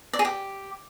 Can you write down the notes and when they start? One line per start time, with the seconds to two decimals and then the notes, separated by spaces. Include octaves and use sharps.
0.13 D5
0.19 G#4
0.25 G4